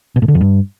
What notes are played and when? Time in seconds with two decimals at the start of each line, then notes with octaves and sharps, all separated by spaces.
0.16 B2
0.22 A2
0.28 D3
0.34 F2
0.41 G2